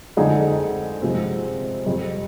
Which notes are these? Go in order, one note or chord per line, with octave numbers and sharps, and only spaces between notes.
F2 D3 G#3 D#4 G#4
C3 F3 G#3 C4
F2 C3 G3